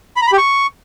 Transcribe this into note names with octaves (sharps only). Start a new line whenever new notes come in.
B5
A#5
B5
G4
C#6